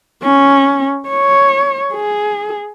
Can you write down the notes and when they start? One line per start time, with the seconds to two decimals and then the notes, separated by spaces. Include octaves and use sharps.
0.23 C#4
1.09 C#5
1.94 G#4